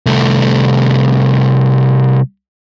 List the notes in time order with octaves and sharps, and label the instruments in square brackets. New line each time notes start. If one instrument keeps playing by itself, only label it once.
[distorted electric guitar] C2 A3